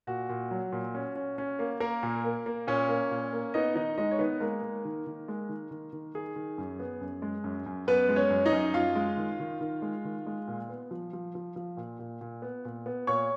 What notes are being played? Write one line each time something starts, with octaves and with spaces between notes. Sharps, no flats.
A#2 F#4
A#2
F#3
A#2
C#4
C#4
C#4
A#3
A#3 A#4
A#2
A#3
A#3
A#2 C#4 C#5
A#3
A#2
A#3
B3 D#4 D#5
D#3 D#4 D#5
G#3 D#4 D#5
C#5
D#3 B3 B4
G#3 A#3 A#4
G#3
D#3
D#3
G#3
D#3
D#3
D#3
D#3 G#4
D#3
F#2
B3
F#2
G#3
F#2
F#2
F#2 B3 B4
G#3
C#4 C#5
F#2
D#4 D#5
F#2
F#2 F4 F5
G#3
D#3
D#3
D#3
G#3
D#3
G#3
A#2
B3
F3
F3
F3
F3
A#2
A#2
A#2
B3
A#2
B3
A#2 C#5 C#6